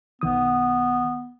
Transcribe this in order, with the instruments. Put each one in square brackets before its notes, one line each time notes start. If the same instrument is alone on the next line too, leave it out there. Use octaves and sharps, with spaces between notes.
[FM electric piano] B1 D#3 D#6 [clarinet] B3